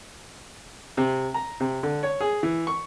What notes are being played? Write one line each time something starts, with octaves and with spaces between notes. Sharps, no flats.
C3
A#5
C3
D3
C#5
G#4
E3
C#6